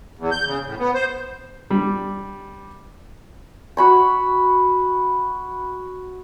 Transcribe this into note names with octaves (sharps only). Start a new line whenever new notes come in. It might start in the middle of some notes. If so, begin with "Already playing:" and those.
E2
G6
C#3
A2
B3
C5
G3 D4
F#4 B5 C#6